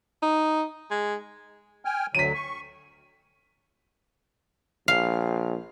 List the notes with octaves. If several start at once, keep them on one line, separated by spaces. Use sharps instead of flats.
D#4
G#3
G5 G#5 F6
D2 D3 F#3 B6 D#7
C#6
A#1 F5